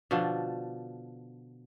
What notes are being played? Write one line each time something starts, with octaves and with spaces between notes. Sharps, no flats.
B2 D3 F3 D4